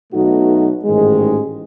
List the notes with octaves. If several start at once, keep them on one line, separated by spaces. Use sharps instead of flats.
B1 B2 A3 D#4 F#4
A1 G#2 D#3 G#3